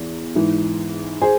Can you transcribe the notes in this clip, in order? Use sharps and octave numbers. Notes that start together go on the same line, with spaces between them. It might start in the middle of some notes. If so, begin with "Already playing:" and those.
Already playing: E2 E3
G#2 E3
G#4 C5